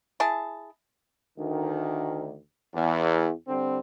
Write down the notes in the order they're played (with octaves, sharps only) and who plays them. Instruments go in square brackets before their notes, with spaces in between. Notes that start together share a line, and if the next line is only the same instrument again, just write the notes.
[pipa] E4 G#4 A5
[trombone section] D2 D#3
E2
D3 G3 C4